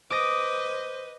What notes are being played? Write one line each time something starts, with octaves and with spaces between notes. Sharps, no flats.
B4 C5 D#5 D6 D#6 A#6